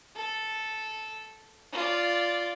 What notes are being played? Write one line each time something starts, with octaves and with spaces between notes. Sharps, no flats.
A4
F4 D5